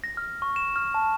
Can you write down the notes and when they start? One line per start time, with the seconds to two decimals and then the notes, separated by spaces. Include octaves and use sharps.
0.04 A#6
0.17 F6
0.42 C#6
0.56 E7
0.76 F6
0.94 A5